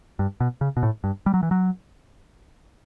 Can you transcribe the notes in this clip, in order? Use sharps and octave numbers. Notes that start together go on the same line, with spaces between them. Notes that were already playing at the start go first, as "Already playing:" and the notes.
G2
B2
C#3
B2
A2
G2
G3
F#3
E3
F#3